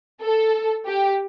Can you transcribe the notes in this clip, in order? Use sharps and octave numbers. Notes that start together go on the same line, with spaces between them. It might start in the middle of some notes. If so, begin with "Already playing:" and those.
A4
G4